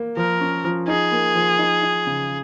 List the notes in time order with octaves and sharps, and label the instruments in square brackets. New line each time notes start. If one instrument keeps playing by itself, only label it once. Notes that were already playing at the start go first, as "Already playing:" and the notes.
Already playing: [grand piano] A#3
[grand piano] F3 [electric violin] A#4
[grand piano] C#4
F3
[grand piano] D#4 [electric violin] G#4
[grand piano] A#3
F3
D#4
D#4
C#3